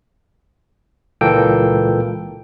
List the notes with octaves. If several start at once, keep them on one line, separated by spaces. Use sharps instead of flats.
C#2 A#2 E3 A#3 A4 G5